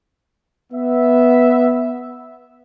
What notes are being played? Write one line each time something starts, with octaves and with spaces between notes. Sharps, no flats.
B3 E5